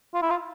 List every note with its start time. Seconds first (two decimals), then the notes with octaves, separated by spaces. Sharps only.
0.14 F4
0.22 E4
0.30 F4